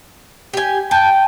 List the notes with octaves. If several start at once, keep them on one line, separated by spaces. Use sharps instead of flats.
G4 G#5
G5 A5